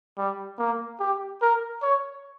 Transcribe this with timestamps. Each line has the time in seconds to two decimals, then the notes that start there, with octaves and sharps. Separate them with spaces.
0.18 G3
0.58 A#3
1.00 G4
1.42 A#4
1.82 C#5